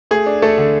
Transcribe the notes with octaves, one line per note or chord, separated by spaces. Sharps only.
A3 G#4
D4
A3 A4
D3